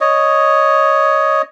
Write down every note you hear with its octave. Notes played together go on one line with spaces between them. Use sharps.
C#5 D#5